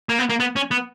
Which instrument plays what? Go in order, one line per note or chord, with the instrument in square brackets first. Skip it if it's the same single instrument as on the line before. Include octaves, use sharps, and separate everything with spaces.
[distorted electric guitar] A#3
B3
A#3
B3
C#4
B3